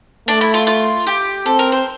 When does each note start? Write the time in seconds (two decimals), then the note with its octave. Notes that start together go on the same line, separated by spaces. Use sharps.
0.28 A3 D4
0.41 E4
0.54 F4
0.67 F4
1.07 G4
1.46 C4 A4
1.59 A#4
1.72 C5